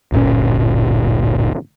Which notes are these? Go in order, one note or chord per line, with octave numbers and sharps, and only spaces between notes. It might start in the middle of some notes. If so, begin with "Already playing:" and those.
D1 G1 A#2 C#4